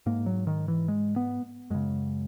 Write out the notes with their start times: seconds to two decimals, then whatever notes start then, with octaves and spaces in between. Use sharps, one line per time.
0.06 G#2 A#3
0.26 F#3
0.47 D#3
0.68 E3
0.88 G#3
1.16 B3
1.70 F#2 C#3 G#3